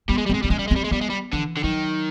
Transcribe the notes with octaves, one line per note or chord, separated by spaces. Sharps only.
G3 B3
G#3
G3
G#3 C4
G3 C4
G#3 C#4
G3
G#3
G3 C4
G#3
G3 B3
G#3
G3
D3 E3
D3
D#3 F#3